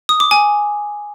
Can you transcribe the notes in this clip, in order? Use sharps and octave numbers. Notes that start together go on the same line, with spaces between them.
D#6
D6
G#5